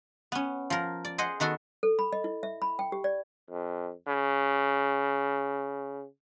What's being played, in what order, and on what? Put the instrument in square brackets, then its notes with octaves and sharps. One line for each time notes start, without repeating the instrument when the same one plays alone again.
[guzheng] B3 C#4
F3 A#4
D5
G#4 C5 D#5 F#5
D#3 B3 F#4 A4
[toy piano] A4
B5
D#5
E4
E5
B5
G5
G4
D5
[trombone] F2
C#3